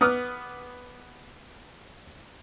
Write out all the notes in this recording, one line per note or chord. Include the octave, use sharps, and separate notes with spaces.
B3 B4 D6 D#6 F6 F#6